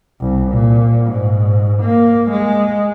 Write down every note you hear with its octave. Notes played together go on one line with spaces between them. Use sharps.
C2
A#2
G#2
A#3
G#3